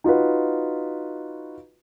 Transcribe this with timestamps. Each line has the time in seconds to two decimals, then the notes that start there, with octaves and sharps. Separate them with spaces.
0.04 D#4 F4 F#4 B4